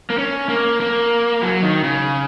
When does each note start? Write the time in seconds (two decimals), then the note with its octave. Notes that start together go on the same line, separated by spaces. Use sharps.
0.10 A#3
0.18 C#4
0.49 A#3
0.80 A#3
1.42 F#3
1.62 D#3
1.83 C#3